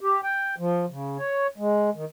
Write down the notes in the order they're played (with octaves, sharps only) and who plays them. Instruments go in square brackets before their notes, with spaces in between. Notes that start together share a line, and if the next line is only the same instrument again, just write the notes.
[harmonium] G4
G5
F3
C#3
C#5
G#3
D#3